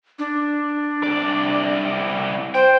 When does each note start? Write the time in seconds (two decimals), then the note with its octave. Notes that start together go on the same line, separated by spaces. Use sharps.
0.19 D4
1.03 C2 D5
2.54 C5 G5